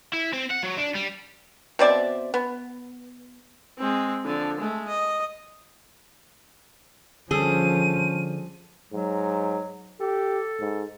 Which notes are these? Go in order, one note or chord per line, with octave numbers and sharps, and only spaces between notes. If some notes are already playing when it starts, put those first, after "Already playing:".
E4
C4
F#5
F#3
D4
G3
B2 C4 D5 E5
B3
G#3 C4
D3 F3
G#3 A3
D#5
D3 F3 G3 C#4 G#4 A4 D#7
G#2 F#3
G4 A4
G#2